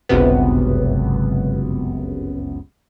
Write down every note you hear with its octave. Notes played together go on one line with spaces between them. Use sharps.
G1 C#2 F#2 C3 B3